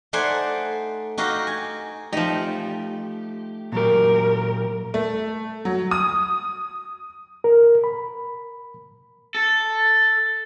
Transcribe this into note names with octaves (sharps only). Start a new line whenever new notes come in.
A3 D#4 C5 D5 F#5 G#5
D#4 F#4 G4 D#5 F5
G#5
F3 A3 D#4 G4
A#2 F#3 G4 A#4
A3
F#3
D#6
A#4
B5
A4